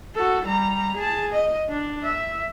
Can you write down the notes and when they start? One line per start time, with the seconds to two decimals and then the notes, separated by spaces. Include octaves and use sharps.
0.15 F#4 A4
0.45 G3 A#5
0.96 G#4 A5
1.33 D#5
1.69 D4
2.03 E5